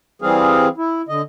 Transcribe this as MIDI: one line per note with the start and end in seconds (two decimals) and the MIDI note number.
0.22 0.68 52
0.22 0.68 55
0.22 0.68 60
0.22 0.68 68
0.22 0.68 77
0.78 1.02 64
1.09 1.22 50
1.09 1.22 75